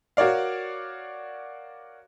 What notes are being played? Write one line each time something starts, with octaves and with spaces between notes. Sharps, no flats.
F#4 A#4 C#5 D5 F5